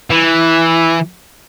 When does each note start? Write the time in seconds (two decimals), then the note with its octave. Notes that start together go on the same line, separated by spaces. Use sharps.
0.10 E3